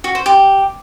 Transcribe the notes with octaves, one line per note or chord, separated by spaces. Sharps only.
F#4
C5
G4